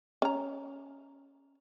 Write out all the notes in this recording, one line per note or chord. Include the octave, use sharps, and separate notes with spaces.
C#4 A#5